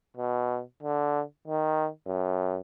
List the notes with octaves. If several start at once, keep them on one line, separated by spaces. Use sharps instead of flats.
B2
D3
D#3
F#2